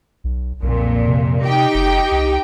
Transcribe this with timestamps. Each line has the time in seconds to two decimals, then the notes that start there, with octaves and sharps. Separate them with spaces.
0.24 B1
0.62 B1 F2 A#2
1.07 C3
1.42 D#4 G4 G5
1.74 F#1
2.11 C2